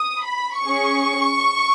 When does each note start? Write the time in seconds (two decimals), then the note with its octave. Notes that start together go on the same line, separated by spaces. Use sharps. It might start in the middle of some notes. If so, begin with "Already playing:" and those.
Already playing: D#6
0.24 B5
0.63 C#4 G#4 C#6